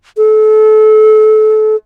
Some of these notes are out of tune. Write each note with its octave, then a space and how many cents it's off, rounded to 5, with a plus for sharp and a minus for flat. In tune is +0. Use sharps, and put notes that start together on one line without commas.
A4 -30